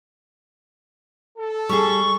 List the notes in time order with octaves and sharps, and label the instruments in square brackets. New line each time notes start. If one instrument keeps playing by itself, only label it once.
[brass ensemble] A4
[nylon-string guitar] G3 G#4 [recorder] C#6